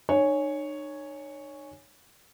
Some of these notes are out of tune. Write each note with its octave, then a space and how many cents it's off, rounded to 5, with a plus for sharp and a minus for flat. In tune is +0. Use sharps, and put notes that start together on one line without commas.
D#4 -45 C#5 +0 G#5 +0